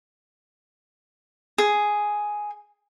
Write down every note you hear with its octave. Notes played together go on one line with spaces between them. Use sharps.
G#4